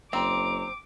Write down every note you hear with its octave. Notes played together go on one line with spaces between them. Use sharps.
F#1 C4 A#5 D6